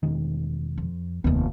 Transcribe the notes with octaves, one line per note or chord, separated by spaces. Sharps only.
E1 D#3
F2
F1 D#2 D#3 B3